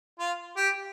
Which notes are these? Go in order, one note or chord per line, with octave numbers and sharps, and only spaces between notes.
F4
G4